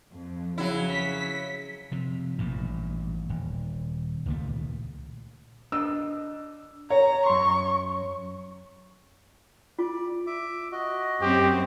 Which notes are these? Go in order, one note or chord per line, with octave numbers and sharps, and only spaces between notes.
F2
C#3 F#3 E4
B6
C3 F3
A1 G2 A#2
D#1
C#2 A#2 D#3 A3
D4 D#5 E6
C#5 A#5
F#2 C6 C#6
F4 D5
E5 D6
F#4 D#5
F#2 C4 G4